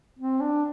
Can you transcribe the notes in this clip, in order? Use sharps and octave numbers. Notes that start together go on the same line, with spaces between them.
C4
D4